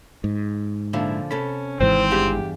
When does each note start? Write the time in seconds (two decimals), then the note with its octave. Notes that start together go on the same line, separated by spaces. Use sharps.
0.24 G#2
0.93 A#2 D3 F3 E4
1.31 C3 C#4 A4 B5
1.80 G#1 G#2 E3 C4 C5
2.11 E2 G2 G4 G#4